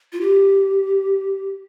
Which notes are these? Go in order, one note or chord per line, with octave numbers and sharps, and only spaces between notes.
F4
G4